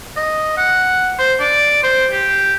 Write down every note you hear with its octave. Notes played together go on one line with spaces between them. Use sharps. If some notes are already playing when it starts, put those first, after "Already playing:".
D#5
F#5
C5
D5
C5
G4